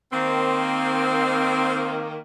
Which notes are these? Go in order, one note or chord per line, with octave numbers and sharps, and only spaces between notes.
D#3 A#3 C4